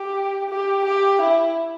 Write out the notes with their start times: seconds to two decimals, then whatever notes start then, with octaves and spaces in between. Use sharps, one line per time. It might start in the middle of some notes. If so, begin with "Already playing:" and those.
Already playing: G4
0.49 G4
0.85 G4
1.21 E4